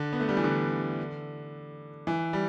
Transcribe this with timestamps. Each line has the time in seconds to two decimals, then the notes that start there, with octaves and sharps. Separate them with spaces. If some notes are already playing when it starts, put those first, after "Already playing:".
Already playing: D3
0.13 B3
0.20 A3
0.29 G3
0.37 E3
0.44 D3
2.07 E3
2.33 G3